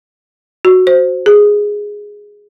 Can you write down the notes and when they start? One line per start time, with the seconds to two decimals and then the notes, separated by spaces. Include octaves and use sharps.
0.65 F#4
0.87 C5
1.26 G#4